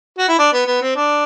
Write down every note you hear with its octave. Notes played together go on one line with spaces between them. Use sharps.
F#4
E4
D4
B3
B3
C4
D4